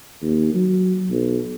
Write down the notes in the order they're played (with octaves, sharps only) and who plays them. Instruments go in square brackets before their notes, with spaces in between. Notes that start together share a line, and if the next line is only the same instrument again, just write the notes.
[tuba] D#2
F#3
B1